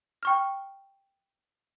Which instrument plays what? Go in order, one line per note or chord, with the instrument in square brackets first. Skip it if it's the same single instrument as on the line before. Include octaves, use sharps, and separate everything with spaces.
[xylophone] G5 C#6 F6